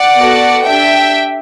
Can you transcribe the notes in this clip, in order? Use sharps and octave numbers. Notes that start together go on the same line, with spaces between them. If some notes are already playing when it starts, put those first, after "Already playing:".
Already playing: D5 F#5
B3 F#4 A4
D4 G4 E5 G5